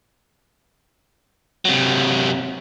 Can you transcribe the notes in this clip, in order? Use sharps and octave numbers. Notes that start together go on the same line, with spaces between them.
C3 F#3